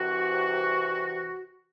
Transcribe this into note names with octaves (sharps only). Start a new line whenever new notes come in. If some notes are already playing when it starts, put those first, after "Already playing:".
Already playing: C2 C3 E3 F#4